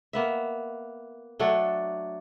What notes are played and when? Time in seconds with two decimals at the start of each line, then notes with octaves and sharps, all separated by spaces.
0.13 A#3 B3 E5
1.39 F#3 A3 D4 A4